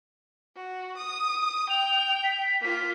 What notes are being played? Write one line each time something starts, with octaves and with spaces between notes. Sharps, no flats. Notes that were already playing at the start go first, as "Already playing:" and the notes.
F#4
D#6
G5 F7
B6
A#3 F4